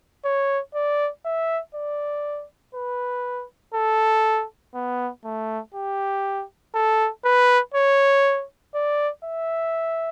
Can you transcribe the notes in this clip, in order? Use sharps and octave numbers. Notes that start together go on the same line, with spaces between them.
C#5
D5
E5
D5
B4
A4
B3
A3
G4
A4
B4
C#5
D5
E5